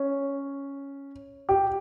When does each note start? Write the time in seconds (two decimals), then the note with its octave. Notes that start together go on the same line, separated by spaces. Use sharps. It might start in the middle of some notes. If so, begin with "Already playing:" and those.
Already playing: C#4
1.49 G4